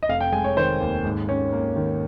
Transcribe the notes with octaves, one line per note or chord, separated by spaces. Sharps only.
D#5
F1 F5
G5
G#3 G#5
C#5
D#3 C5
D#2
G#2
C#4
A#3
D#3